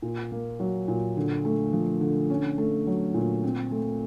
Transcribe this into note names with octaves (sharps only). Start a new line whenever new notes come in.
A#2
A#3
F#3
A#2
D3
A3
F3
D3
C#4
A3
F#3
A#2
C4
A3